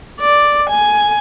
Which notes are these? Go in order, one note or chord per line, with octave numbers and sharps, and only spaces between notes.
D5
G#5